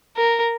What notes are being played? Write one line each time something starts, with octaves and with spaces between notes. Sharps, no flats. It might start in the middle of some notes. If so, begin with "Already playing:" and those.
A#4